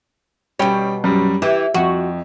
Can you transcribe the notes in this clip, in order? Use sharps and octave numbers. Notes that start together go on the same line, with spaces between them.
B2 G3 C#4 G5
F#2 G3
E3 G4
F2 F#4